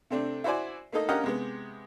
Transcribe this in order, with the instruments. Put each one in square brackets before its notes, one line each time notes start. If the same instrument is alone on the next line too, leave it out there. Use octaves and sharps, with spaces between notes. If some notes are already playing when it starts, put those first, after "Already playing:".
[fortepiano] C3 A3 C4 D4
E4 F#4 C5 D5 G#5
A3 A#3 D#4 A4 D#5
C#4 G4 A#4 D#5 F5 F#5
C3 G#3 B3